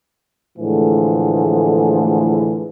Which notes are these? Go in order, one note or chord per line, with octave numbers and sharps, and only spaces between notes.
A2 D3 E3 F3 G#3 A3